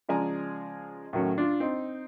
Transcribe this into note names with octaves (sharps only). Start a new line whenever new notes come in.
C#3 F3 G#3 D5 G#5 A#5
A2 D#3 F#3 C#4
D4 F4
C4 D#4